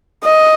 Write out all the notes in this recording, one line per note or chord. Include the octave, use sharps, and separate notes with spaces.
D#5